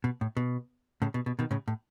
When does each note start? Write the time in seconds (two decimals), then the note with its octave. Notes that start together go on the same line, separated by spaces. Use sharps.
0.04 B2
0.21 A2
0.37 B2
1.02 A2 C#3
1.14 B2
1.26 B2
1.39 B2 D#3
1.51 A2 C#3
1.68 A2